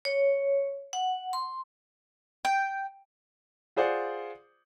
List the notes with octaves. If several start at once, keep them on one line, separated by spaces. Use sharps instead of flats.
C#5
F#5
C6
G5
F4 G#4 C5 D5 F#5